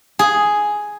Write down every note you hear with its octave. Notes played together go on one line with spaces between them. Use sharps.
G#4